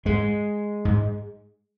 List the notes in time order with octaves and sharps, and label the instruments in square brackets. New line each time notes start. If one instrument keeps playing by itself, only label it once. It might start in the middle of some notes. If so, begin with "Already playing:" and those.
[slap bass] G#2 G#3
G#2